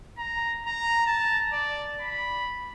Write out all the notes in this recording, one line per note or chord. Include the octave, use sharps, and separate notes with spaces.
A#5
A#5
A5
D5
B5